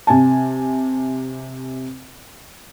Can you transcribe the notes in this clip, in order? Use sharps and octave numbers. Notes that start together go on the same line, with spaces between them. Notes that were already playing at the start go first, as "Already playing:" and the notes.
C3 G#5 A5